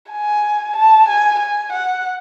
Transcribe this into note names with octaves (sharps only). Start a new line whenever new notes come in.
G#5
A5
G#5
G#5
F#5